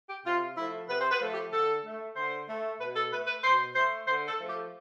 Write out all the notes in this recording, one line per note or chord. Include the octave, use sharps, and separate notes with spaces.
G4
C3 F4
F3 A3 E4
C3 B4
C5
B4
F3 A3
G4
D3 A4
A3
D3 C5
A3
B2 B4
A4
A3 B4
B4
B2 C5
A3 C5
D3 C5
A4
F3 A3
G4